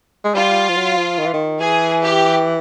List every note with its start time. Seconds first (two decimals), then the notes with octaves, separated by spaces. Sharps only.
0.24 G#3
0.34 G3 F4
0.69 F3
0.76 F#3
0.97 F3
1.19 D#3
1.26 E3
1.34 D#3
1.60 E3 G#4
2.02 G4